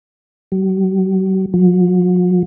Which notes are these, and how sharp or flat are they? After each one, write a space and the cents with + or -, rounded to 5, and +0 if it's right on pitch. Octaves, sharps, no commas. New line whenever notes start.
F#3 +45
F#3 -45